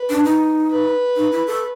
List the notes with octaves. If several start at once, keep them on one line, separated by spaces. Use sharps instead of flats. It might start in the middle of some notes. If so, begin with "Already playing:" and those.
Already playing: B4
D4
D#4
B4
D#4
E4
A4